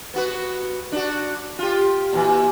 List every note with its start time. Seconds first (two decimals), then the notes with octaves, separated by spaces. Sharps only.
0.14 B3 F#4 B4
0.92 D4 F#4
1.59 F4 G4
2.13 A#2 E3